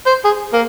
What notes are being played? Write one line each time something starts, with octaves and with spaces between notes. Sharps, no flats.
C5
G#4
A#3